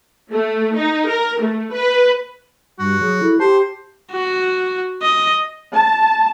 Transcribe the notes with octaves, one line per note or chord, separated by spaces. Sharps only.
A3
D#4
A#4
A3
B4
G2 G3 F#4
F#3 G#4
E4 A4
G4 C5 A5
F#4
D#5
A5